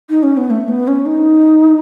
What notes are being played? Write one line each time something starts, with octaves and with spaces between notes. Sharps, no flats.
D#4
C#4
B3
A3
B3
C#4
D#4